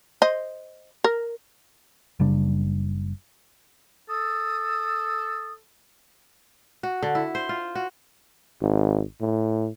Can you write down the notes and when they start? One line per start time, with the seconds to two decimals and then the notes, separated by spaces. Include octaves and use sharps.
0.22 C5 D#5
1.04 A#4
2.20 F#1 C#3 G3 D4
4.09 A4 D#6
6.83 F#4
7.03 D3
7.15 E4
7.35 C5
7.49 F4
7.75 F#4
8.61 G#1
9.21 A2